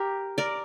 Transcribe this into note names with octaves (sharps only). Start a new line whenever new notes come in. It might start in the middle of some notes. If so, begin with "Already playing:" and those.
Already playing: G4 A#4
A#4 D5